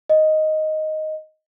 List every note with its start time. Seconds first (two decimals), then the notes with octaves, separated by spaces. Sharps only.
0.10 D#5